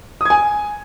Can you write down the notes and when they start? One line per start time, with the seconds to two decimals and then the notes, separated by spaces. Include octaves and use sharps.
0.21 D#6
0.25 G#6
0.30 G#5